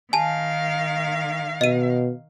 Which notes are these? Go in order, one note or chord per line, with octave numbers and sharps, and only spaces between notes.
D#3 F5 G#5 A5
B2 D#5 D#7